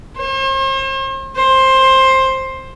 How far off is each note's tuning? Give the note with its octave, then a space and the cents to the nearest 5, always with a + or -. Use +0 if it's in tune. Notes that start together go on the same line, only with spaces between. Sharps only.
C5 +45
C5 +15